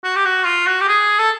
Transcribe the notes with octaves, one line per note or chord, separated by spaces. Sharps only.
F#4
G4
F#4
F4
F#4
G4
G#4
A4